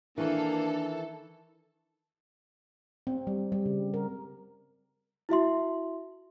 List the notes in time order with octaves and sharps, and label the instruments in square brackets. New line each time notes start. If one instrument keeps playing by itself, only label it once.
[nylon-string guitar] D#3 E3 [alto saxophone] A#3 [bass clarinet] D4 [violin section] A4
[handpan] C4
G3
G3
C#3
A#4
[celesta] E4 F#4 E5 C6